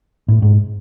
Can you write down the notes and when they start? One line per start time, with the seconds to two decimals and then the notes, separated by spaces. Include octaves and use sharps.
0.28 A2
0.42 G#2